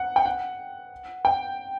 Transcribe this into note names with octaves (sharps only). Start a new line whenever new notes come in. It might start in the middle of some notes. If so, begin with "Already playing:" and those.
Already playing: F#5
G5
F#5
G5